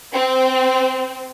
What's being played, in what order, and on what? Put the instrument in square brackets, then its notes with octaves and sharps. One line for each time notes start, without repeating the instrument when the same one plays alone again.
[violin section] C4